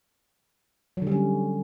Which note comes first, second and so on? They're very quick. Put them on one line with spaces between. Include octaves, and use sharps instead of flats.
F#3 D3 G3 C#4